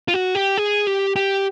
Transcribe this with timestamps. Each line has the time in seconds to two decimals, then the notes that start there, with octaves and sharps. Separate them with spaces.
0.08 F4
0.14 F#4
0.35 G4
0.58 G#4
0.87 G4
1.16 G4